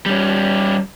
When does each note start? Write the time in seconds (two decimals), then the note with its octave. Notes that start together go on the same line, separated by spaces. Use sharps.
0.06 G3 C#4